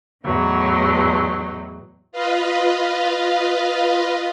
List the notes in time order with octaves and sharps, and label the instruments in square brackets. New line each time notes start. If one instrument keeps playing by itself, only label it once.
[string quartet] E2 A2 F#3 D#4
[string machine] F4 B4 D#5 F5